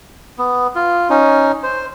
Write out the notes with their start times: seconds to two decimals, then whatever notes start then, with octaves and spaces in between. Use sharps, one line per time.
0.38 B3
0.75 F4
1.10 C#4 D#4
1.63 C5